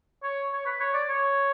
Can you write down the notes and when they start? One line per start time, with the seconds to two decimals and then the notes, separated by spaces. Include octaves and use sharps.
0.23 C#5
0.52 C#5
0.66 B4
0.80 C#5
0.94 D5
1.09 C#5